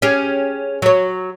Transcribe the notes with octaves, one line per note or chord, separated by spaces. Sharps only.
C#4 G4 G#4
F#3 C#5